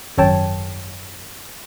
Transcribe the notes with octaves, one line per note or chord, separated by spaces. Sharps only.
G#1 F#2 A4 C#5 G5 A5